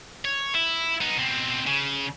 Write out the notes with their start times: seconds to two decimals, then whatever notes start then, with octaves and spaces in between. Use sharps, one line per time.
0.25 C#5
0.55 E4
1.01 B3 D#4
1.17 B2 C4
1.67 C#3